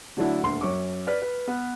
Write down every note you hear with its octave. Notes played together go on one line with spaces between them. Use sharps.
D3 F#3 A3 D4 E4
D#1 D2 C6
F#2 C#4 C#6 D6
B4 D5 F6 B6
B4
B3